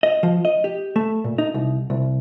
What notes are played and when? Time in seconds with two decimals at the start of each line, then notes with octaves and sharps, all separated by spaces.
0.03 D#5
0.23 F3
0.45 D#5
0.64 G4
0.96 A3
1.24 A#2
1.38 D#4
1.54 C2
1.90 C2